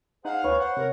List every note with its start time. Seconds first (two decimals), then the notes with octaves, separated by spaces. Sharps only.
0.25 D#4 G#4 C5 F5 F#5
0.44 D2 B4 C#5
0.59 C5 F#5
0.77 C3 A#4